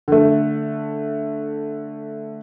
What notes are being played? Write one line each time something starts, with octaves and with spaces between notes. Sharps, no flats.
D3 A3